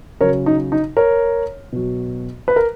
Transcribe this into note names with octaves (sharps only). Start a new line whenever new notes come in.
C#3 F#3 A#4 C#5
D#4
D#4
A#4 C#5
B2 F#3
B4
A#4